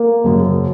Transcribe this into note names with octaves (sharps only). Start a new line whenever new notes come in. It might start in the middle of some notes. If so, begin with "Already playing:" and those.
Already playing: A#3
F#1 F#2 C#3